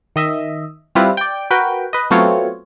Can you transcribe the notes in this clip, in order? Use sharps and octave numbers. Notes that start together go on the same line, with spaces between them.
D#3 D#5 E5
G3 C4 E4 F4 B4
D5 G5
F#4 A#4 B4 G5
B4 D#5
F#3 A3 B3 C4 F4 C#5